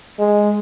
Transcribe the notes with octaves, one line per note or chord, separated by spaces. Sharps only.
G#3